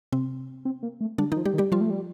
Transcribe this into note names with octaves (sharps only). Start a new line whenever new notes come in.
C3 C4
C4
A#3
A3
D3 G3 D4
D#3 D#4
F3
G3 G4
D#3
G3 G4
F3 G3 F4
A3
G3